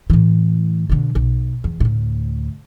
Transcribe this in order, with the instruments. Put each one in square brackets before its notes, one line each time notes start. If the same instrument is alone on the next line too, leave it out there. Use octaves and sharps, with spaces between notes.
[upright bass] A2 E3
B2 D3
B1
E2
D2 A2